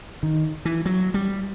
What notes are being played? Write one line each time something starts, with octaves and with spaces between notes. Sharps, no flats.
D#3
E3
F#3
G3